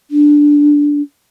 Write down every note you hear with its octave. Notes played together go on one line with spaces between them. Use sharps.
D4